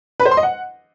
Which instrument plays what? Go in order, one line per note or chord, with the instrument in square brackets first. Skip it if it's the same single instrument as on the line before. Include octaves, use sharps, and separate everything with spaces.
[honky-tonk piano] B4
C5
C6
D#5
F#5